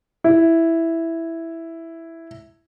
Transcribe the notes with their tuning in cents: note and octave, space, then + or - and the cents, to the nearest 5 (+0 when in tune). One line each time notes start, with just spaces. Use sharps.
E4 +0